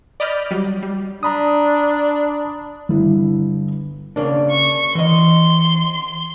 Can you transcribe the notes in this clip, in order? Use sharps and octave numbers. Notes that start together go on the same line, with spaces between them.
D5 D#5 B5 F6 G6
F#3 G3
G3
D4 A#5 B5 D#6
G1 E4
C#3 A#3 D4
C#6
E3 D#5 C6